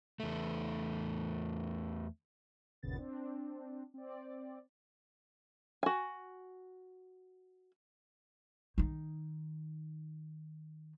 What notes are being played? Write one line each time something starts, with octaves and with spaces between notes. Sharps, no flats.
E2 A3
G1 D#2 A#2 C#3 B3 A6
C4 D4
C4 D5
F#4 G#5
D#3 D#4